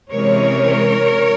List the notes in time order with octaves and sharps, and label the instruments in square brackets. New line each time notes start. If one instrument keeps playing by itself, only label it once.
[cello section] C3 E3 G#3 C#4 A#4 C#5